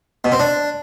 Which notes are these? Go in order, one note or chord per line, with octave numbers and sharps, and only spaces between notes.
B2
C4
D4